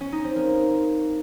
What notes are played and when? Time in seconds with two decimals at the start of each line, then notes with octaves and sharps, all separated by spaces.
0.01 C#4
0.12 D#4
0.24 C4
0.36 A#3